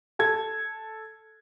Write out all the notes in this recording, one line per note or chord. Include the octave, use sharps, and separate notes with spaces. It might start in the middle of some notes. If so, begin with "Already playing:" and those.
A4 G#6